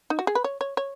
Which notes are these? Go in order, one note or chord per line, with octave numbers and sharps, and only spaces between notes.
D#4
F#4
G#4
B4
C#5
C#5
C#5